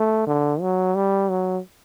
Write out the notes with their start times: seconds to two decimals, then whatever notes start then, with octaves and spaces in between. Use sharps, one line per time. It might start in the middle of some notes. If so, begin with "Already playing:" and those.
Already playing: A3
0.27 D3
0.61 F#3
0.95 G3
1.30 F#3